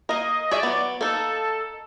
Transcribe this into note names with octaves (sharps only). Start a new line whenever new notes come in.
A#3 A#4 D#5
G#4 C#5 D5 E5
F#3 B3
A#3 D#4 A4